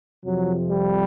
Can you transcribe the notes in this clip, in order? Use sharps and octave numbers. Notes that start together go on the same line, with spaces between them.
F2 C3 F3 F#3
G3